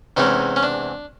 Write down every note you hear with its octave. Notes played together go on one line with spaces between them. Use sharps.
E2 C3 E3 G#3 C#4 D#4
C#4
D4